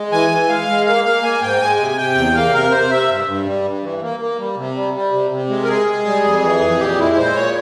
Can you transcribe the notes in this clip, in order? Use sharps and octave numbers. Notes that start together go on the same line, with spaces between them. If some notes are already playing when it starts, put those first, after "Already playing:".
Already playing: G#3
E3 G#5
E3
G#3 F5
G#3
A#3 F5
A#3 F5
A#3 G#5
G#2 G5
G#3 G#5
C3
G#5
C3 G5
E2
A#3 F5
C3 A#4
C3 C5
C3 E5
G2
G2
G3
G2
E3
A#3
A#3
G3
C3
G3
G3
C3
C3
G#3
A#4
G#3 G#4
G#3
G3
F2
E3
F2
A#2 G4
G#3 E4
A#2 C5
A#2 C#5